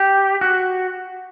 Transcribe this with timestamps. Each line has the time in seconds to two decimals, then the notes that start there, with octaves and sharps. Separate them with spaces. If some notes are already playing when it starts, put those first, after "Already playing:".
Already playing: G4
0.41 F#4